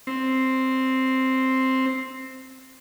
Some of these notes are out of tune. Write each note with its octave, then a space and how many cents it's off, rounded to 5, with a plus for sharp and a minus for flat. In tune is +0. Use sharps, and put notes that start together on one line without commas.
C4 +0